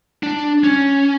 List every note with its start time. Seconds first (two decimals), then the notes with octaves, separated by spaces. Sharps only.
0.23 D4
0.64 C#4